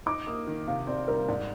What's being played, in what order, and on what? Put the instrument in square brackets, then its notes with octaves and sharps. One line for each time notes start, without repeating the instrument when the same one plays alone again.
[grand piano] D#4 [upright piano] D6
[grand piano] A#3 [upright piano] D#6
[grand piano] D#3
[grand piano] C3 [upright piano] F5
[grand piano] C4 [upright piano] D5
[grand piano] G3 [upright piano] A#4
[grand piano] G#2 [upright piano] D5